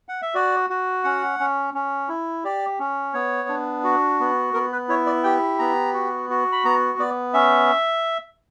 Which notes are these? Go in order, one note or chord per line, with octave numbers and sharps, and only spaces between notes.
F#5
E5
F#4 D5
F#4
C#4 F#5
C#4
C#4
E4
G4 D5
C#4
B3 C#5
D4
F#4
B3
B3 A#4
B4
E4 C#5
D5
G4 G5
B3 A#5
F#4
F#4
B5
B3 A#5
B3 D5
C#4 E5